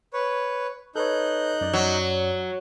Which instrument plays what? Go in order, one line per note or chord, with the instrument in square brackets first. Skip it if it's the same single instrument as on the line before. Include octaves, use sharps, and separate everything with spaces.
[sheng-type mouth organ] B4 C#5
[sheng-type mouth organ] D#4 F#6 G6 [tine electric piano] A4 B4 C#5
[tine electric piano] F#2 D5
[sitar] F#3